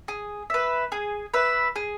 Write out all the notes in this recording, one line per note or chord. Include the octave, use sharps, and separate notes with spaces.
G#4
B4 E5
G#4
B4 E5
G#4